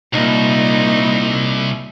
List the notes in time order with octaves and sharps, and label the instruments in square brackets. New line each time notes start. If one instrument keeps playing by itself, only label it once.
[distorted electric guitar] C2 [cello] A#2 D#4